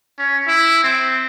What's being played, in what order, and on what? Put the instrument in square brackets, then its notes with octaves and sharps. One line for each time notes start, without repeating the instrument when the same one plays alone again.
[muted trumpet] C#4
E4
C4